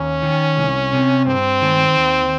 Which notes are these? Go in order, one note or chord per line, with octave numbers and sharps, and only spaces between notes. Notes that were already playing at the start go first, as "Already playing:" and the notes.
Already playing: D#2 C#4
D#3
C2
C3
G2 C4
D#3
D#2